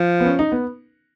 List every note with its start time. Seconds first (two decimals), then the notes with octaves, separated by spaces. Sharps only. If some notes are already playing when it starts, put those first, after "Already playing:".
Already playing: F3
0.20 B3
0.26 C#4
0.39 D#4
0.52 B3